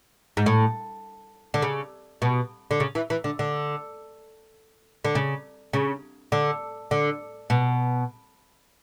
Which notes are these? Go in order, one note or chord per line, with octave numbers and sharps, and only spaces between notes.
G#2
A2
D3
C#3
B2
D3
C#3
E3
E3
D3
D3
D3
C#3
C#3
D3
D3
B2